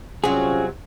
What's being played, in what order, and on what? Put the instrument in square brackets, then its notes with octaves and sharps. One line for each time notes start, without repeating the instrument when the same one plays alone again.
[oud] C3 F#3 [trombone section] G3 C4 F4 [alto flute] C#4 [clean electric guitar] G#4